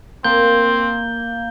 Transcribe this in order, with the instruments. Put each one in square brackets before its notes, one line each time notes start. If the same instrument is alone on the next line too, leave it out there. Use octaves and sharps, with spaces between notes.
[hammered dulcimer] A#3 [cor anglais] C4 [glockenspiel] G6 G7